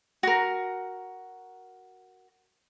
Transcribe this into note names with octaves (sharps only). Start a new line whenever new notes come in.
F#4 A#4